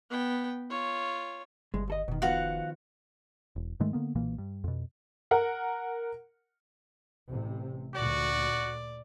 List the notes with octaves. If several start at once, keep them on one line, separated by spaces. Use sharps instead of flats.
B3 G5
F4 C#5
G1 C2 G2 G#3
D#2 A4 D#5
F1 B2 D#3
D#3 F3 B3 F#4 F5 F#5
E1
G#2 D#3 G#3 A3
D3 A#3 B3
B1 A#2 E3 A#3
G2
F2 B2
A#4 F#5
A1 C3
D2 A#2 F#4 D5